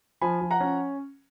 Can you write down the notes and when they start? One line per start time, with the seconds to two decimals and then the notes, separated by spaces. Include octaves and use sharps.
0.21 F3 G#5 B5
0.41 F3
0.51 F#5 A#5
0.60 C#4